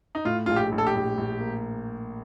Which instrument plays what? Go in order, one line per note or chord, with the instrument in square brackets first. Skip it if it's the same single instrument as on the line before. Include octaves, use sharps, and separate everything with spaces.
[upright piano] D#4
[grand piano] A2 [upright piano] F4
[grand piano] A#1 [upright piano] F4
[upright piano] G4
[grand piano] A#1
[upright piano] A4
G4
[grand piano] A#1
A#1
A#3